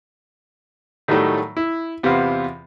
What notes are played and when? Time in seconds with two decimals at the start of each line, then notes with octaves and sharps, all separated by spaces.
1.08 A2 D#3 F#3 G3 A3
1.57 E4
2.03 E2 C3 B3 C4 F4 F5